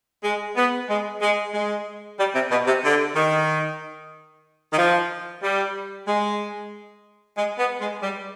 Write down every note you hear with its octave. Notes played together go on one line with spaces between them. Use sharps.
G#3
B3
G#3
G#3
G#3
G3
C3
B2
C3
D3
D#3
D#3
F3
G3
G#3
G#3
B3
G#3
G3